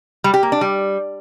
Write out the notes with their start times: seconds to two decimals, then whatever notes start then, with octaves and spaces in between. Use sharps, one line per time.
0.24 G3
0.34 G4
0.43 A#3
0.52 D4
0.61 G3